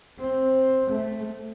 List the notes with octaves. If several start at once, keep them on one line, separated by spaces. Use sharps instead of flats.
C4
A3